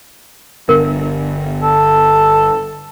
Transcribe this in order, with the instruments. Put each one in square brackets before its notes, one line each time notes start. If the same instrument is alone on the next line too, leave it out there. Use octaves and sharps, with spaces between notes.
[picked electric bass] G1 D3 B3 [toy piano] A#4
[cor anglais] A4